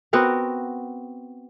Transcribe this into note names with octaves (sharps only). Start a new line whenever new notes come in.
B3 C4 F#4 A#4